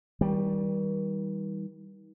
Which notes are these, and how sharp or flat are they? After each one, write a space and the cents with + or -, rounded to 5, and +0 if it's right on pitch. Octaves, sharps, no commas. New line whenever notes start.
D#3 +45 G3 +0